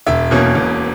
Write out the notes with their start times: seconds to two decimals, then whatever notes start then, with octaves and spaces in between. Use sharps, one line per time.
0.07 E1 E5
0.31 E2 B2 A#3 C#4
0.55 E1